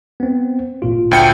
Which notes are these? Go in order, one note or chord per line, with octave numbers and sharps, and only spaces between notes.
B3 C4
G#1 A#2 F4
D2 G5 C#7